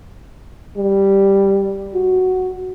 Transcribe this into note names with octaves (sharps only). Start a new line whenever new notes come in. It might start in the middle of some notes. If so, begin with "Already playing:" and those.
G3
F#4